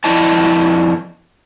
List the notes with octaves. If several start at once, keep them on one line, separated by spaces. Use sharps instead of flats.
F2 E4 D#5 A5